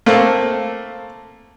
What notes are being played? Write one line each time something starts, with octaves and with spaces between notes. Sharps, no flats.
A3 A#3 C4 A4